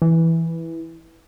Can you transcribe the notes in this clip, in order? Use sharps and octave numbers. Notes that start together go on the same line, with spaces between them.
E3